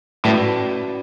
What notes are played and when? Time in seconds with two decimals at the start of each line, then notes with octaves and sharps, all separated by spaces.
0.25 A2 C#4 F#4 B4 D5